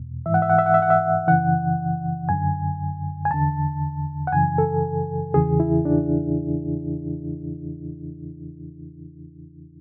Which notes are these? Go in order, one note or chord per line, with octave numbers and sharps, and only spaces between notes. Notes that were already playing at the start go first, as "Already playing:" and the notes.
Already playing: E2 B2
G#2 E3 E5
F#5
E5
F#5
E5
F#5
E5
F#5
E5
F#2 C#3 E3 F#5
F#2 D3 G#5
G#5
E2 D3 A5
F#5
F#2 C#3 E3 G#5
A4
E2 C#3 E3 G#4
E4
D4